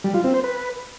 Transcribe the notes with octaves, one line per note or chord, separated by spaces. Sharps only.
G3
F4
C4
C5
B4